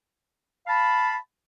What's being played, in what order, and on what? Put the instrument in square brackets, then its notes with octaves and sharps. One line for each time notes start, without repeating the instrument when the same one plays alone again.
[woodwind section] F5 A5 B5